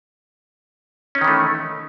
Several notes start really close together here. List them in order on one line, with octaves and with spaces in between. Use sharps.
C#4 D#4 D#3 E3 A3